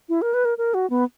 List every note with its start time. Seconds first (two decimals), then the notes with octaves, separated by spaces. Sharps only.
0.09 E4
0.22 A#4
0.34 B4
0.45 A#4
0.58 A#4
0.74 F#4
0.90 B3